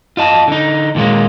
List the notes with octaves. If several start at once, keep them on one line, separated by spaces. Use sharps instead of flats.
F4 D#5 A5
D3 D#4
D#2 A#2 D#3 G#3 A#3